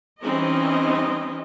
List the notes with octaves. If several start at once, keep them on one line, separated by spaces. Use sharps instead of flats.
E3 G3 C4 C#4 D#4 D#5